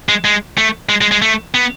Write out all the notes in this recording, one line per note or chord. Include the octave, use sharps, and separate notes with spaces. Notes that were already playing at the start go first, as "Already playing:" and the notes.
G#3
G#3
A3
G#3
G#3
G#3
A3
B3